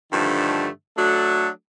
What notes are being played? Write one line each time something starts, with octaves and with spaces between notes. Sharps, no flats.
G2 D3 D#3 F3 A3
F#3 A3 D4 F#4 A4